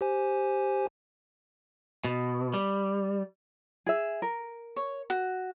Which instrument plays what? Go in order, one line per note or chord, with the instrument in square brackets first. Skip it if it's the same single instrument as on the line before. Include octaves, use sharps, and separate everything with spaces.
[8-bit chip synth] G4 C5 G#5
[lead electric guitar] B2
G3
[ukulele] G#4 E5
A#4
[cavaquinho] C#5
F#4